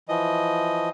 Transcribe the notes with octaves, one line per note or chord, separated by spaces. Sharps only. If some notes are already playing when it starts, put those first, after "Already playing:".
E3 F3 D#5